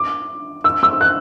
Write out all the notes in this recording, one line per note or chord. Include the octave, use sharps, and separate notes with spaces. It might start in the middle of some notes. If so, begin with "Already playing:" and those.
Already playing: D6
E6
E6
F#6